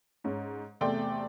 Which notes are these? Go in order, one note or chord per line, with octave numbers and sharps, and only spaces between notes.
G#2 C#4
E2 C3 A3 D5 G5 C6